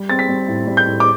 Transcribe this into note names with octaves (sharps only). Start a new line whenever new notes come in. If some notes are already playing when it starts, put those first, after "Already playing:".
Already playing: G3
C4 A6
B6
G3
A2
G3
G6
A2
D6